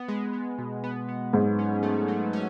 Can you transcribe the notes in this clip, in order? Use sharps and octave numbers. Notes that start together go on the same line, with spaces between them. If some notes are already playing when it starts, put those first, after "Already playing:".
Already playing: B3
G#3
B3
B2
B3
B3
G#2 F#3
C#4
A3
F#3
C#4